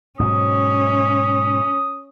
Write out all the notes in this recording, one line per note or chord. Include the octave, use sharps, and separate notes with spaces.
G#2 B2 F#3 C#4 D#6